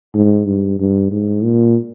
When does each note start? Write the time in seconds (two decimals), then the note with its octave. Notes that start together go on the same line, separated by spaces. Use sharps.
0.15 G#2
0.47 G2
0.80 G2
1.12 G#2
1.44 A#2